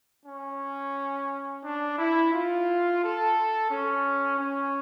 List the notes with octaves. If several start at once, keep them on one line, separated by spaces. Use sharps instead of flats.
C#4
D4
E4
F4
A4
C#4
C#4